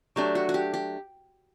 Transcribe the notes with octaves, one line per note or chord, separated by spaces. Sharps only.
F#3 A3 D4 G4
F#4
F#4
G4
G4